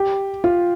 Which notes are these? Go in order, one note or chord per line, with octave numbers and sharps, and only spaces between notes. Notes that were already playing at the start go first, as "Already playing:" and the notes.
Already playing: G4
F4